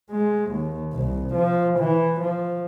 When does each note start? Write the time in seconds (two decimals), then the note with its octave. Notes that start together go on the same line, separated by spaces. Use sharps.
0.11 G#3
0.51 D#2
0.93 C2
1.34 F3
1.79 E3
2.20 F3